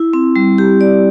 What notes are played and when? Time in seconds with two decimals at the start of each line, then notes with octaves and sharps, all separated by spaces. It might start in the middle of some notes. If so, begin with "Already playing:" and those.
Already playing: E4
0.13 C4
0.36 G3
0.58 G4
0.81 D5